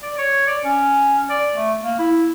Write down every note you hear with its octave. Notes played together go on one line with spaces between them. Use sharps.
D5
C#5
D5
C#4
D5
A3
A#3
E4